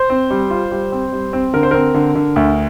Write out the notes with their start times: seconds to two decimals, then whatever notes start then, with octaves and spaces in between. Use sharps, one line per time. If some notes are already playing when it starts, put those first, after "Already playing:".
Already playing: C5
0.10 C4
0.30 G3
0.51 F4
0.71 G3
0.92 C4
1.13 G3
1.33 C4
1.53 D3 A#4
1.63 C5
1.71 C4 A#4
1.94 D3
2.15 D3
2.36 D2